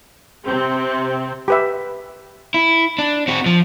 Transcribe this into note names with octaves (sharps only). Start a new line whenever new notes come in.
C3 C4
G4 B4 E5
E4
D4
C4 F#4
F3